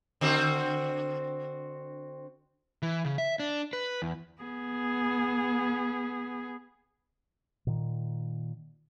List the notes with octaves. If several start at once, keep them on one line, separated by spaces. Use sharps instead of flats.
D3 C4 F#4
E3
C#3
E5
D4
B4
E2
B3 G#4
A#2 D#3